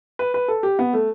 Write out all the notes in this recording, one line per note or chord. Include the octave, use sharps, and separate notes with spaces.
B4
B4
A4
G4
B3
A3